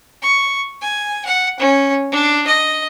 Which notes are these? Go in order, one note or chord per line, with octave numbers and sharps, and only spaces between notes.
C#6
G#5
F#5
C#4
D4
D#5